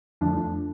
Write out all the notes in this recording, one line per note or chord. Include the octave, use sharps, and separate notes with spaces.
F2 D3 F3 A3 D4